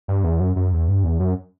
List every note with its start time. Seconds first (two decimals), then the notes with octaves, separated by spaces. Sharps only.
0.08 G2
0.24 E2
0.40 F#2
0.56 F#2
0.73 E2
0.88 G2
1.04 E2
1.20 F#2